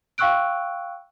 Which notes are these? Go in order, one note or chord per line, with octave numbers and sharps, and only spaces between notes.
F5 G5 C#6 E6 F#6 D7